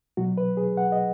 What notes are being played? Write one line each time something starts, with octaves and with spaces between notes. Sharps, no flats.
B2 F#3 F#4
B4
G#4
F#5
D#5